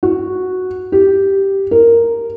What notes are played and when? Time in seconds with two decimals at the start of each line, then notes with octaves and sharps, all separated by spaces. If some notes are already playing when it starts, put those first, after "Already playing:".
0.03 F#4
0.92 G4
1.71 A#4